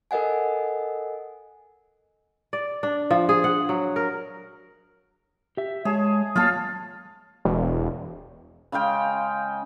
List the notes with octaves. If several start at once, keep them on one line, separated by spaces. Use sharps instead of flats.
A4 A#4 D#5 F#5 G#5
D5
D4
F3
G#4
F#5
F#3
A#4
G4 E5
G#3 G#4 C#5 A5
F#3 A#3 F4 C#5 F5 A5
E1
C#3 G#3 F5 G5